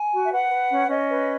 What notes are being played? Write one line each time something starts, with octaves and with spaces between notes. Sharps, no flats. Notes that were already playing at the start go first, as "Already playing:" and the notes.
Already playing: G#5
F#4
E5
B4 F#5
B4
C#4
C#4 D#5
B4